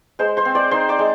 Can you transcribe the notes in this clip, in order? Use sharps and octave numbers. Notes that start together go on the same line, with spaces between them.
G#3 C5 C6
C5 C6
C4
D5 D6
D#4 C5 C6
D5 D6
G#3